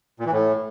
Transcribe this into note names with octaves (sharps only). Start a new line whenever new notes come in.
A#2
E3
A2